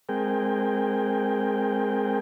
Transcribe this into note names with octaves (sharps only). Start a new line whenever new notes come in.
G#3 C4 G#4 A#4 G5